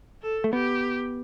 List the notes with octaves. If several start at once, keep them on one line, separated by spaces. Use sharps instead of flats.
A4
A3
B3 G4